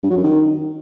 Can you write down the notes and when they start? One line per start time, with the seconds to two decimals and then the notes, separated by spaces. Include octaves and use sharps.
0.03 G2
0.10 F#3
0.17 F#2
0.24 D#3